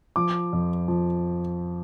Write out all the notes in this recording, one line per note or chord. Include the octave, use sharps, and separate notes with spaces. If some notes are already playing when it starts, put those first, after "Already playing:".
F3 D6
F2
F3